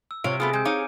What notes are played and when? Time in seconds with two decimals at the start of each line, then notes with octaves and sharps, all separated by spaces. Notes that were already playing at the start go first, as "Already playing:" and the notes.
0.11 E6
0.24 C3 F4 C#5 F5 D7
0.40 A3 B3 F4 G#4 D#6
0.53 G#3 G#5 G6
0.65 D#4 C#5 F5 D6 D#7